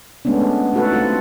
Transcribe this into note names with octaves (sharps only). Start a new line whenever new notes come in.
G#3 A3 B3 C#4 D4
A3 D#4 F#4 A4 B4 F#5
A3 C4 F4